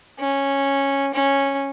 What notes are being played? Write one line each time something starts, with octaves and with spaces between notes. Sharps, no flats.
C#4
C#4